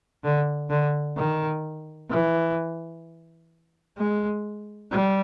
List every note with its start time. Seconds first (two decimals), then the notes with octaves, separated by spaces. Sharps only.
0.24 D3
0.70 D3
1.17 D#3
2.10 E3
3.98 G#3
4.92 G3